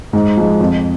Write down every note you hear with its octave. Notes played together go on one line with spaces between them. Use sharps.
G#2
F3 G#3
F2